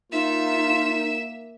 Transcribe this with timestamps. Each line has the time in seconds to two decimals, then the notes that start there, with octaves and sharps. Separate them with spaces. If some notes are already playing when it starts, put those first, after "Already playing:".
0.12 A#3 D#4 F4 E5 E7